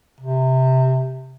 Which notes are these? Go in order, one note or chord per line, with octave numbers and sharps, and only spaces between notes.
C3